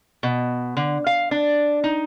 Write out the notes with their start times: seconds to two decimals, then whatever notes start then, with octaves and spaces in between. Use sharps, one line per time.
0.23 B2
0.77 D3
1.07 F5
1.31 D4
1.84 D#4